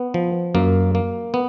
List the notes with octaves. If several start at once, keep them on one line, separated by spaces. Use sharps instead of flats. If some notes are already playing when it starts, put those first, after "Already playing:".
Already playing: B3
F3
F#2 A#3
A#3
B3